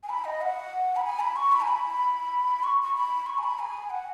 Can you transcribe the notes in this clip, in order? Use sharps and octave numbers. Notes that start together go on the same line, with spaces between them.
G#5
B5
D#5
F#5
B5
G#5
B5
C#6
B5
G#5
B5
C#6
C#6
B5
C#6
G#5
B5
G#5
F#5